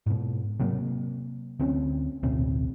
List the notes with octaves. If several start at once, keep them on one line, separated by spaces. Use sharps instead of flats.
G#2 B2
C3 F#3 A#3
D2 C4 C#4
A1 D2 B2 C4